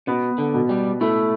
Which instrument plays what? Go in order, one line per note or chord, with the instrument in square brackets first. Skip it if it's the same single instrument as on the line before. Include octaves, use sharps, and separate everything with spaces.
[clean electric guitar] B2 [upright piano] B3
[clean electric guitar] D3
[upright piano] B2
[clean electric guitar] G3
[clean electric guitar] A3 [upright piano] E4